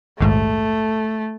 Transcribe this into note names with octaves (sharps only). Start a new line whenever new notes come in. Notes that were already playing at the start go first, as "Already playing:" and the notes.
A#1 D#2 G#2 A3